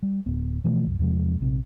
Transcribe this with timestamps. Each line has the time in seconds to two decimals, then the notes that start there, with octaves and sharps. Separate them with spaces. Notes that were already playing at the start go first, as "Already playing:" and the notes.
0.03 G3
0.26 D1 B3
0.64 B2 E3 F3 A3
0.86 C2 F#2
0.99 E2 C3 F3 G#3
1.41 A#1 C3